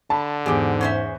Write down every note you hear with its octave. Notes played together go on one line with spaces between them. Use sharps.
D3 A5 B5
E2 G#2 G#3 G4 G#4
C#4 C5 E5